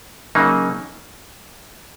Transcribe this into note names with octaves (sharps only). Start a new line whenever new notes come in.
C#3 F#3 A#3 D#4